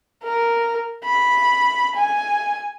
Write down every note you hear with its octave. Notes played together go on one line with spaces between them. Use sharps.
A#4
B5
G#5